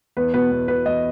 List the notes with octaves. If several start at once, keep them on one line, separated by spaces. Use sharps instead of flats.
E2 B4
B2 B4
E2
B2 B4
E2 D#5